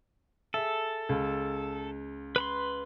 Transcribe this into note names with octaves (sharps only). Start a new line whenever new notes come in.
G#4 A4 E5
C#2
B4 B5 C6